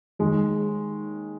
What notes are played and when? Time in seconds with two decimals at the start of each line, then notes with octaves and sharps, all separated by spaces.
0.19 D#2 D#3 G#3